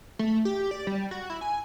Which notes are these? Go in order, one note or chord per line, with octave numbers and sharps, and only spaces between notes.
A3
G4
D5
G3
F#4
E4
G#5